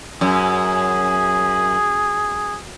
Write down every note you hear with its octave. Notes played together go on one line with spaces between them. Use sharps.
F#2 G#4